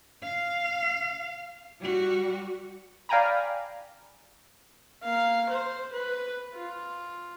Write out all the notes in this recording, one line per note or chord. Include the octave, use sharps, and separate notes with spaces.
F5
G3 F#4
D5 F5 G5 G#5 A#5 B5
A#3 F5
C5
B4
F4